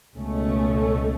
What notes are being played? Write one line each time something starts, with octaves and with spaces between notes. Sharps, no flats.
C#2 B2 A3 C#4